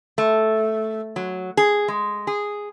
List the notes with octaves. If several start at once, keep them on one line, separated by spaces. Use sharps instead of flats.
A3
F#3
G#4
G#3
G#4